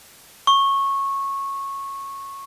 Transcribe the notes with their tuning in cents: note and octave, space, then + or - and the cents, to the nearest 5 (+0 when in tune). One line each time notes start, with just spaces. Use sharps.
C#6 -15